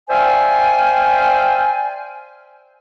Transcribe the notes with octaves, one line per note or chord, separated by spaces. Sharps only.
C5 D5 E5 F5 G5 G#5